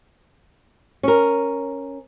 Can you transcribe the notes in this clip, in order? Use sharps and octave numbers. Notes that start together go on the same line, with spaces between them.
C#4 A#4